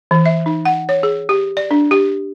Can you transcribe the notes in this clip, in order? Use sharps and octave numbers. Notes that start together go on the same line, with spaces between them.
E3
E5
D#4
F#5
C#5
G#4
G4
D5
D4
G4